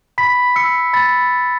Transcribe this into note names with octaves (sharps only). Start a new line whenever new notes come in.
B5 B6
E6 C#7
B5 A6